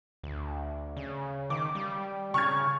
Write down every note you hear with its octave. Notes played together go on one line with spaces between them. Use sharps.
D2
C#3
D#3 D6
G3
C#3 C#6 F6 G#6